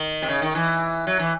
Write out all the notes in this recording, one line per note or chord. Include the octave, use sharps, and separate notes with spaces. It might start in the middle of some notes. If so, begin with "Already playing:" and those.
Already playing: D#3
C3
C#3
D#3
E3
F#3
E3